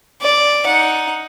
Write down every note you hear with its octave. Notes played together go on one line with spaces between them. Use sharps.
D5
D#4 F#5